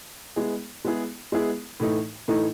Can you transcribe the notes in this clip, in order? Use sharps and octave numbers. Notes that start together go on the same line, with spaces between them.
G#3 B3 E4 G#4
G#3 B3 E4 G#4
G#3 B3 E4 G#4
A2 E3 A3 D#4
A2 E3 A3 D#4